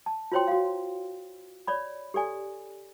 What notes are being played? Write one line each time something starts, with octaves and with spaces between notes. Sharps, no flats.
A5
F4 F#4 C5 C#5 G5 C6
F#4 F5
C#5 D5 B5
G4 A4 D5 G#5